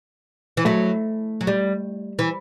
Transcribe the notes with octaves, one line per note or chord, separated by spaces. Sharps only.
E3
F#3 A3
F#3
G3
E3